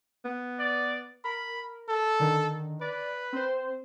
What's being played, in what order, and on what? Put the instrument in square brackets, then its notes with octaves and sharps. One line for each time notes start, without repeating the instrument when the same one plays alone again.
[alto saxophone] B3
[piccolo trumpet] D5
[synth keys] A#4 [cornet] B5
[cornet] A4
[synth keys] D3 D#3
[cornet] B4 [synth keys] D5
[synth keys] C4 C5